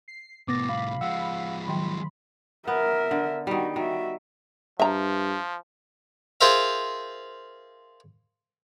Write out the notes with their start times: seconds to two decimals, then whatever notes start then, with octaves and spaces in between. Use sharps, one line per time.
0.08 C7
0.48 C2 A2 B3 D6 A6 A#6
0.69 F5 B5
1.01 F3 G#3 F5 F#5 E6
1.68 D#3 F#3 G5 C6
2.68 B3 A#4 E5
3.11 D3
3.47 D#3 G3 D#4 F#4
3.76 D#3 F#4 E5
4.80 G2 F3 E5 A#5
6.41 F4 G#4 A#4 C5 E5 F5